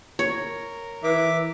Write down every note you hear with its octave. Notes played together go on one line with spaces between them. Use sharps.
A#4 C#5
E3 E5 D6